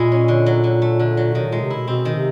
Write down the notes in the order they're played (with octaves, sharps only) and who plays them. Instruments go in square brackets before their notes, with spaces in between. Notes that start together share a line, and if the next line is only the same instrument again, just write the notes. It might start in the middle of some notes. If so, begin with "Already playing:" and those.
Already playing: [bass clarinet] A#2 [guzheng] G#3 E4 G#4
[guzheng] C#4
D3
F#3
D3
A3
D3
F#3
[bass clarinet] B2 [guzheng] D#3
[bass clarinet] A#2 [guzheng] G#3
[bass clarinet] C3
[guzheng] E4
[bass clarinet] B2
[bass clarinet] B2 [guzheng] C4
[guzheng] D#3
[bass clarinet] C3